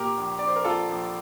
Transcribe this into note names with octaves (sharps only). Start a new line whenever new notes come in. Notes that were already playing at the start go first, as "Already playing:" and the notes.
Already playing: A#2 G4 A#4
A#1
A#1 D5
C5
A#4
A#1 F4 A4
A#1